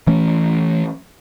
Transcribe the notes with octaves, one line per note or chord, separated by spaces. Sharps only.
E3 A3 C#4